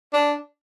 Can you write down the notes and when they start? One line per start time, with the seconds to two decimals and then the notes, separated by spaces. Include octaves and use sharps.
0.13 D4